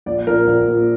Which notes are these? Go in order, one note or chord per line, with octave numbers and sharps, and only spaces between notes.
A#1 D5
A#2 F3 A#4
A#1
A#2 F3